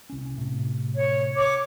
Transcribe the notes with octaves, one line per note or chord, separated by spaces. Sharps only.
C2 C#4
A2 C3
C#5
C#5 D6